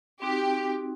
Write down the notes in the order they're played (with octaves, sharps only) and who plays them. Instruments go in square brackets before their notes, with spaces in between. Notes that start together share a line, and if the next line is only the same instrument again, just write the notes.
[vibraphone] C4 D#4 F#4 [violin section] G4